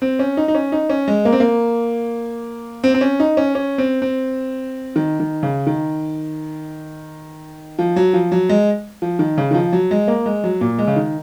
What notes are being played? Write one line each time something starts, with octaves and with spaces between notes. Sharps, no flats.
C4
C#4
D#4
D#4
C#4
D#4
C#4
G#3
A#3
C4
A#3
C4
C4
C#4
D#4
C#4
C#4
C4
C4
D#3
D#3
C#3
D#3
F3
F#3
F3
F#3
G#3
F3
D#3
C#3
D#3
F3
F#3
G#3
A#3
G#3
F#3
A#2
G#3
C#3
D#3